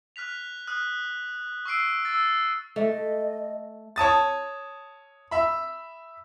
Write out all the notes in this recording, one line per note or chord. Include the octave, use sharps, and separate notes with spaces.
F6 F#6 B6 F7
D#6 F6 F#6
C#6 E6 C7 D7
E6 A6
A3 D#5
C#5 A5 D#6 A6
E5 B5